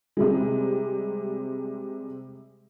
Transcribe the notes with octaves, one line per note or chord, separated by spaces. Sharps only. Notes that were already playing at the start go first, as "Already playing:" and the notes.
C3 G3 G#3